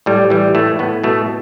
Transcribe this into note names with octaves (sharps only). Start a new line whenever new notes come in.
A2 G3
E3 G3
A2 A3
A2 B3
B2 A3